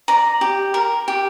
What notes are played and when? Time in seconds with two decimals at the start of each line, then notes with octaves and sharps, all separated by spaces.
0.08 D5 A#5
0.41 G4
0.74 A#4
1.08 G4